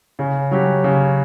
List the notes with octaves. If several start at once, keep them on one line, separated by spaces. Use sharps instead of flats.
C#3
F#3 C#4 G4
C#3